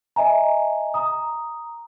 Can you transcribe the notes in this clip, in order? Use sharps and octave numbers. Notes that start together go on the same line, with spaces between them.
D#5 E5 G#5 A#5
A#5 D#6